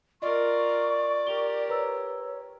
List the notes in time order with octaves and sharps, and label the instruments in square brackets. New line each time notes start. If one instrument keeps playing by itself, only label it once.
[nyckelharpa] F4 A#4 [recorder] D5 [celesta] D#5 [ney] C#6
[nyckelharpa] G4 A#4 [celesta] F7 G7
[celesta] B4 A#5 E6 [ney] C#5